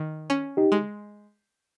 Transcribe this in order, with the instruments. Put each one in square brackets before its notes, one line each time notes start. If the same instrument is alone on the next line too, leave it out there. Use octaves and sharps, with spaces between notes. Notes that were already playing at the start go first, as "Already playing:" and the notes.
Already playing: [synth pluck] D#3
C#4
[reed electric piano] D#4 G4
[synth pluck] G#3